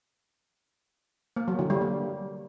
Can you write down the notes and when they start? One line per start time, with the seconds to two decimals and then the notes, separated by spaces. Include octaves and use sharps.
1.36 A#3
1.48 F#3
1.59 D3
1.70 G3
1.81 A#3